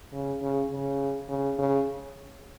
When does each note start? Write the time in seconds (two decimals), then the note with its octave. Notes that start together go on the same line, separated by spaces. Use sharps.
0.13 C#3
0.42 C#3
0.70 C#3
1.29 C#3
1.59 C#3